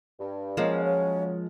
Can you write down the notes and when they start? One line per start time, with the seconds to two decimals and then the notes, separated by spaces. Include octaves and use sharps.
0.19 G2
0.57 C#3 F3 F#3 G#3 A#3 C#4 D#5
0.84 C#5